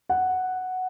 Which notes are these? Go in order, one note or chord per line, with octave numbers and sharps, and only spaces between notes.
F#5